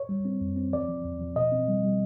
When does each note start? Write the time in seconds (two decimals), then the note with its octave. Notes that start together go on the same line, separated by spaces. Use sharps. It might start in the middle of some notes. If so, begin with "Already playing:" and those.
Already playing: C#5
0.09 G3
0.25 C4
0.41 F2
0.56 C4
0.73 F3 D5
0.88 F3
1.05 E2
1.21 F3
1.36 B2 D#5
1.52 C4
1.68 G3
1.84 G3